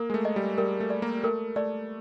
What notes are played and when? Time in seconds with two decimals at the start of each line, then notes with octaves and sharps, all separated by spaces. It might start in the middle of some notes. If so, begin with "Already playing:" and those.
Already playing: A#3 A#4
0.10 G#3
0.14 A3
0.25 D#5
0.36 G3
0.58 G3 A#4
0.80 A3
0.90 D5
1.02 A#3
1.23 A3 A#4
1.56 A3 D5